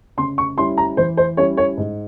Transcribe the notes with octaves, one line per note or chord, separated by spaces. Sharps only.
C#3 C6
C#6
G3 C#4 E4 C6
A#5
E3 C5
C5
G3 C#4 E4 C#5
C#5
G#2